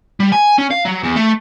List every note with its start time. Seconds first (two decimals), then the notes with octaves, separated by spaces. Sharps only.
0.20 G3
0.32 G#5
0.58 C#4
0.71 F5
0.85 F#3
1.04 E2
1.16 A3